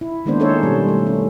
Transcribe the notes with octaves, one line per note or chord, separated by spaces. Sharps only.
E4
D#3 G#3 A#3 B3 D4 C5
C#4 D#4 A4 C5 C#5
B2 G3
A3
C#4